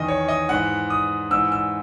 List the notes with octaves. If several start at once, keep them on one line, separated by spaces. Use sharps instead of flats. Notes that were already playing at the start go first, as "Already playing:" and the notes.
Already playing: E2 D#3 D#5
C#5
D#5
G#2 E3 F#5
D#6
G#2 E3 E6
E6